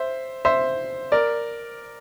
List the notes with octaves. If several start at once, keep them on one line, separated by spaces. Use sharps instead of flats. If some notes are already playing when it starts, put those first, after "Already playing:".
Already playing: C5 E5
C5 E5
A#4 D5